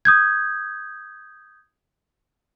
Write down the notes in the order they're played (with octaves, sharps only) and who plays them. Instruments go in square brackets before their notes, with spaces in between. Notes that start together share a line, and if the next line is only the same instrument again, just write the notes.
[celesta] D#6 G6 G#6